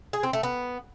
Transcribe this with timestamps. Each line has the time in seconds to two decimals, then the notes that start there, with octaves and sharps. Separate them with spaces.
0.13 G#4
0.23 C4
0.33 A3
0.43 B3